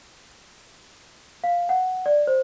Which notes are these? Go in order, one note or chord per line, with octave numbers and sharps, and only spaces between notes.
F5
F#5
D5
C5